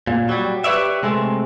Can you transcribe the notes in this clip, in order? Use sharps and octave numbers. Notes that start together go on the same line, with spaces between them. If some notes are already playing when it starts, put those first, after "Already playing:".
A#2
F#3 G3
G4 B4 C#5 D5 E5
C3 G#3 A3 C4